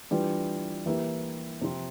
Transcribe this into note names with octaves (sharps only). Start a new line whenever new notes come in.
E3 G3 D4 F4
E3 A#3 E4 G4
C3 F3 C4 F4